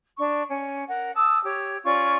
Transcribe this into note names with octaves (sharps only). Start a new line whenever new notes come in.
D4 C#6
C#4
A#4 F#5
A5 D#6 E6
G4 C#5
C#4 F4 D5 C#6